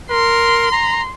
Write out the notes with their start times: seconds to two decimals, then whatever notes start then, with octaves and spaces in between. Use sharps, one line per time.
0.11 A#4 C6
0.72 A#5